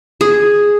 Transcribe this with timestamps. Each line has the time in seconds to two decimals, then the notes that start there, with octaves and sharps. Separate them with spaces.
0.21 G#4